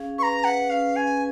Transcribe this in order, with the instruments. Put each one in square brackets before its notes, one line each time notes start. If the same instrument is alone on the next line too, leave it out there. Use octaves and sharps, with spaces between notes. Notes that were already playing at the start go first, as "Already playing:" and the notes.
Already playing: [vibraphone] C#4 G#4 F5
[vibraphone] B4 [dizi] C#6
[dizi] A#5
[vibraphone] B4 [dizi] F#5
[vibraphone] C#4 [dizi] F5
[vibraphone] C#4 [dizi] G#5